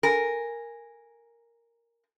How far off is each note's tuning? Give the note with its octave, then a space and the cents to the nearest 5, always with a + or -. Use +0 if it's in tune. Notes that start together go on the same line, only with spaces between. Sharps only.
A#4 +0 G#5 -10